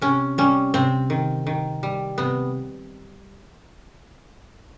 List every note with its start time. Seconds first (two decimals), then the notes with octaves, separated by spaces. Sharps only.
0.01 C3 C#4
0.38 G3 C#4
0.74 C3 C4
1.10 D#3
1.47 D#3
1.83 G3
2.18 C3 B3